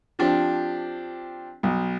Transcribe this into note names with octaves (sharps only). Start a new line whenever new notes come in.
F3 C4 D4 G4
B1